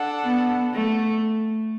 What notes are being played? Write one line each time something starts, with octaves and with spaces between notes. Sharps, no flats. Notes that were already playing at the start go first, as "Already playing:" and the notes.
Already playing: D4 A4 F#5
B3
A3